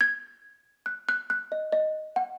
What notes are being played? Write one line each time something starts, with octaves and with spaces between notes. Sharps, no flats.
G#6
F#6
F#6
F#6
D#5
D#5
F#5